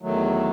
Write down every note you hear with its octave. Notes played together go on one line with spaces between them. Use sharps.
E2 D#3 F#3 A3